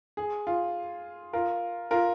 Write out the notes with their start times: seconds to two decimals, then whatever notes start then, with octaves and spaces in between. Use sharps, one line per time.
0.17 G#4
0.47 F4
1.33 F4 A#4
1.91 F4 A#4